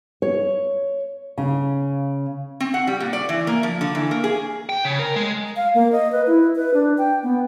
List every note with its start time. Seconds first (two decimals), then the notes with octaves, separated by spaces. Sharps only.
0.22 C#5
1.38 C#3
2.60 C4
2.74 F#5
2.87 G3
3.00 A#2
3.13 D5
3.29 E3
3.47 A#3
3.63 F3
3.81 D3
3.95 E3
4.11 A#3
4.24 G#4
4.69 G5
4.85 C#3
4.99 A#4
5.16 G#3
5.56 F5
5.75 A#3
5.92 D#5
6.12 B4
6.27 E4
6.56 B4
6.74 D4
6.98 G5
7.23 B3